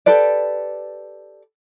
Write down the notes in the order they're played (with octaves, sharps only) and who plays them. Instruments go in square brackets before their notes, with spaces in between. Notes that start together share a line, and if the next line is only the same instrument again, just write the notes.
[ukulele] G4 A4 B4 D5